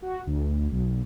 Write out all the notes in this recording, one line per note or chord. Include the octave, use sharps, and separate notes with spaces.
F#4
D2
B1